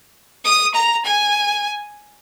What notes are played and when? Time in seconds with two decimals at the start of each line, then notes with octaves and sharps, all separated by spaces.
0.45 D#6
0.75 A#5
1.05 G#5